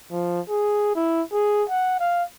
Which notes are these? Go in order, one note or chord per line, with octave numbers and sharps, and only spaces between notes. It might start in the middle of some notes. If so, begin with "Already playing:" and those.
F3
G#4
E4
G#4
F#5
F5